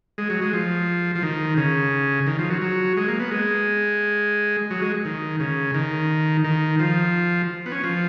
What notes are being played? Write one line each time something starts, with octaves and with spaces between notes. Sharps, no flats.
G#3
F#3
G#3
F3
F3
D#3
C#3
D#3
F3
F#3
F#3
G#3
A#3
B3
G#3
F#3
G#3
D#3
C#3
D#3
D#3
F3
B3
C#4
F3